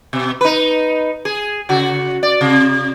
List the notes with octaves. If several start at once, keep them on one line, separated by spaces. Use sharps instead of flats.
B2
D#4 B4
G#4
C#3 F#4
D5
C3